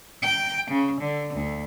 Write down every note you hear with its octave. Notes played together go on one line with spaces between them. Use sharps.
G5
C#3
D3
D2